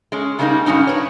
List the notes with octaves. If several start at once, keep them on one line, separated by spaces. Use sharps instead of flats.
G#3 C#4
C#3 G3 G#3 A#3 C#4 D#4
G2 D#3 F#3 C#4 D#4
D4 B4 C#5